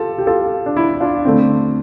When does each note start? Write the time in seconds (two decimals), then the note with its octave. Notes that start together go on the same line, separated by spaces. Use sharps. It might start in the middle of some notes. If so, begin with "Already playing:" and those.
Already playing: F4 G4 A4
0.18 G4
0.27 F4 A4
0.66 D4
0.76 E4
1.00 D4 F4
1.25 D3 A3 C4